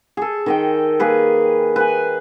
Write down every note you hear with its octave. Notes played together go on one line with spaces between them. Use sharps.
G#4 A4
D#3 D#5 G5
A#3 G#4 B4
B4 G#5